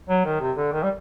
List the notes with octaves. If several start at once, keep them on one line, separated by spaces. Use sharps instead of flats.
F#3
D#3
C3
D3
D#3
G3